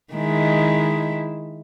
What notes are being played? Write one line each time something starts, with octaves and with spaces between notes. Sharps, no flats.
D#3 G#3 E4